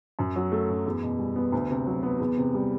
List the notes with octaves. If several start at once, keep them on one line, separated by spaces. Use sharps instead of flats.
F#2
F#3
A3
F#2
E2
B2
G3
B3
D2
C3
F#3
B3
E2
C3
G3